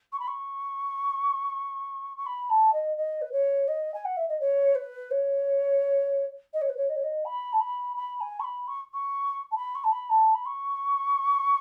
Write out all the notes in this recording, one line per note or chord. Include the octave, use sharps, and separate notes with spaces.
C#6
B5
C#6
C#6
B5
A5
D#5
D#5
B4
C#5
D#5
G#5
F#5
E5
D#5
C#5
B4
C#5
D#5
C#5
B4
C#5
D#5
C#5
D#5
B5
A5
B5
B5
G#5
C#6
B5
C#6
C#6
A5
B5
C#6
A5
B5
A5
B5
C#6